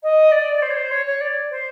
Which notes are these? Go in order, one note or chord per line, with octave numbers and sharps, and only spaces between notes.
D#5
D5
C5
C#5
C5
C#5
C#5
D5
C5